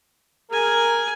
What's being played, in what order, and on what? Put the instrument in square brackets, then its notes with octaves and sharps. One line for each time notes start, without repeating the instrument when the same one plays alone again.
[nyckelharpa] G#4 G#5 [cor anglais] A#4